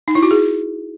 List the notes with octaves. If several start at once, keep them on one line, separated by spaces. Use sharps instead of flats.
D#4
E4
F#4
G#4